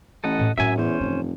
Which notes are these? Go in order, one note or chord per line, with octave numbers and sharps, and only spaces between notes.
A1 A4 D#5 F#5
A2
F#2 A2 C4 E5 G#5
E2 C#4 C5
F1 G2 E3